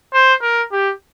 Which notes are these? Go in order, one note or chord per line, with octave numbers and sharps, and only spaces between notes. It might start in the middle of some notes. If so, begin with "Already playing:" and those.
C5
A#4
G4